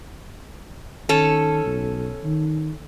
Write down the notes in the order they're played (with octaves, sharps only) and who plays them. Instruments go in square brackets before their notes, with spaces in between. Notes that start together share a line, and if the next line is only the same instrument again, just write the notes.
[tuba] D#3 [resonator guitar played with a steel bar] C#4 A4
[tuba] B1
D#3